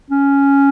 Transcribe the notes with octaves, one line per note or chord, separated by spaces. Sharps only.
C#4